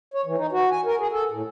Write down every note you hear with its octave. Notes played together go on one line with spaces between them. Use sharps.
C#5
E3
D#4
F#4
G#5
A#4
G#4
A4
A2